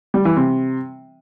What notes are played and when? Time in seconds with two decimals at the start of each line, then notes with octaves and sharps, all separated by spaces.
0.14 G3
0.25 E3
0.37 C3